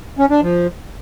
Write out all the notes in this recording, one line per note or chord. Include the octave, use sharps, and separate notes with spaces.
C#4
D4
F3